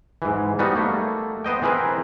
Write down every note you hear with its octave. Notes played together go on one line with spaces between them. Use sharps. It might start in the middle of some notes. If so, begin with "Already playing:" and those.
G#2 E3
G3 B3 D#4 F#4
A3 A#3
B3 C5 D#5 G5
E3 C4 G#4 A#4 B4